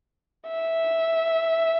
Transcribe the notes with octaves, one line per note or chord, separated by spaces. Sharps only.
E5